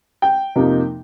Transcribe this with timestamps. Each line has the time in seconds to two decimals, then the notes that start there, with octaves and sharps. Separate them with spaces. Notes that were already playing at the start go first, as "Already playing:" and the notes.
0.22 G5
0.56 F2 C3 F3 A#3 D#4